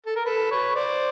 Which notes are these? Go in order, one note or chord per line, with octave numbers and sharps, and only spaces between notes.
A4
A#4
A4 B4
B4 C#5
C5 D5